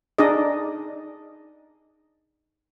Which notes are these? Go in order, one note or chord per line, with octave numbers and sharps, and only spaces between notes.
D4 D#4 G#4 D5 D#5